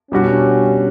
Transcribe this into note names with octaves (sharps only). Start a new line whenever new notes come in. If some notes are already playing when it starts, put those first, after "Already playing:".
B2 G3 C#4 D4 F#4